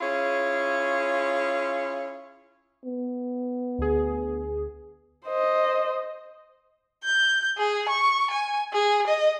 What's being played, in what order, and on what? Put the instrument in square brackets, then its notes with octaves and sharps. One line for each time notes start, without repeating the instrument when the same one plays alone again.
[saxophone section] C#4 E4 F4 G#4 C#5
[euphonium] B3
[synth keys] D2 G#4
[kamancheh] C5 D#5
[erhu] G6
G#4
C#6
G#5
G#4
D#5